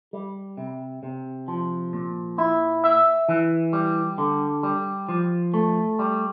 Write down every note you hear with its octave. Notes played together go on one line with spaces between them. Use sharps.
G3
C3
C3
F3
A#2
E4
E5
E3
G3
D3
G3
F3
A3
G3